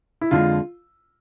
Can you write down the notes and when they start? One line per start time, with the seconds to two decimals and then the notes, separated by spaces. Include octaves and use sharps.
0.21 E4
0.31 F2 D3 F3 G#3 F4